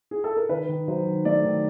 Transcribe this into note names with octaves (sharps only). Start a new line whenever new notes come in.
G#4
A4
A#4
D#3 B4
D#3
F#3 C5
D#3
A3 D5
D#3